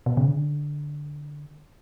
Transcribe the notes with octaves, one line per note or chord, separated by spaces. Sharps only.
B2
C#3
D3